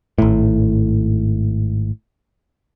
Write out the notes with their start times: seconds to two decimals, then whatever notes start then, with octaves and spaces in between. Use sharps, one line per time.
0.18 G#1 A2